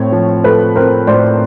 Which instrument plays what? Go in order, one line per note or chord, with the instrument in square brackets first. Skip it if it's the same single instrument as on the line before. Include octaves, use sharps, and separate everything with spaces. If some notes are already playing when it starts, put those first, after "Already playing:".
Already playing: [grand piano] A2 C4 [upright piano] C#5
[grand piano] F3
[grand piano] A3 [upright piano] A4 B4
[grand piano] C4 [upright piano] A#4 C5
[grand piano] A2 [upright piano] C5 D5